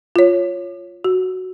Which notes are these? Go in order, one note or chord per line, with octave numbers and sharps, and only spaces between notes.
F4 C#5
F#4